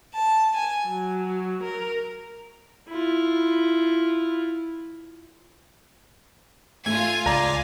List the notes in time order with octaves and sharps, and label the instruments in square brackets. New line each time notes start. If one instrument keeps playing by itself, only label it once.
[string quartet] A5
G#5
F#3
A#4
[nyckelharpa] E4 F4
[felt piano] A3 [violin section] F4 G#5 [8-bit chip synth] G#6
[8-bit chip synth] C#2 D5 [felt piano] A#5 A#6